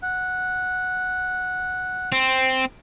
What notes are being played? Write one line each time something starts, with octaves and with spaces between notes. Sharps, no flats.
F#5
C4